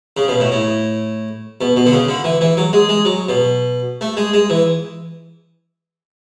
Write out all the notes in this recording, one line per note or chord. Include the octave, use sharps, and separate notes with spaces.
C#3
B2
A2
A2
B2
B2
D3
C#3
D3
E3
E3
F#3
G#3
G#3
F#3
B2
A3
G#3
G#3
E3